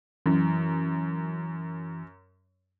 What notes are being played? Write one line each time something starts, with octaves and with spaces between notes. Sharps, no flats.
F#2 E3